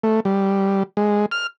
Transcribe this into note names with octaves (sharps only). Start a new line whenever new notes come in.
A3
G3
G#3
F6